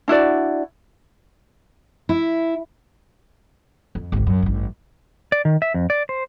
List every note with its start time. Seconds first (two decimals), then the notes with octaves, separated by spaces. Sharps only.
0.08 D4 E4 F#4 D5
2.09 E4
3.95 F2
4.12 G#1 D2
4.27 F#2
4.42 A1 G2
5.32 D5
5.45 D#3
5.62 E5
5.74 F2
5.90 D5
6.09 C5